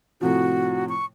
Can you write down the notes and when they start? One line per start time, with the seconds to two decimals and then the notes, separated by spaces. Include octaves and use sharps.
0.21 A2 C3 F3 F#4
0.89 C#6